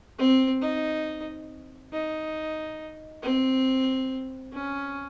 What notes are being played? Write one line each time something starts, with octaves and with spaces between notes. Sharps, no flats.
C4
D#4
D#4
C4
C#4